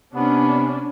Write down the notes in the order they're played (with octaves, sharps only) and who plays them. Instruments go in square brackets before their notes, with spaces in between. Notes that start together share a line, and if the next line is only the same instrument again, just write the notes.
[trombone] C3 [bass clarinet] B3 [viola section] C#4 D4